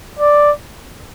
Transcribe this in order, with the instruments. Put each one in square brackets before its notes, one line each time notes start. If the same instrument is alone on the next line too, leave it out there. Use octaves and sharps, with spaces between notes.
[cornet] D5